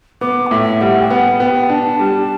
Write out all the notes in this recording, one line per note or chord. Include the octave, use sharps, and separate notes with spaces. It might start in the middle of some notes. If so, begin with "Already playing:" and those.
B3 D6
F#5
A2 E5
G3 F#5
G5
B3 F#5
B3 G5
D4 A5
G3